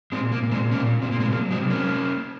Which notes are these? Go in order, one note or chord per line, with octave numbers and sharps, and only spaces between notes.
A#2 G#3 C4
A#3
A#2
G#3 C4
A#2 A#3 C#4
A#2 C4
A#3
G#3 C4
F#3 A#3
G#3 C4
C3
A#3 C#4